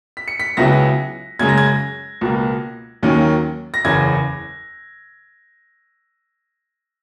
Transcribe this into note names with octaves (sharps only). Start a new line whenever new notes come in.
B6
C#7
B6
C#2 C#3 F#3 B3 E4 A#6
F#2 C#3 G#3 G#6
A#6
G#6
C#2 B2 A#3
D#2 D#3 F#3 A#3 C#4
A#6
F#1 E2 C#3 G#6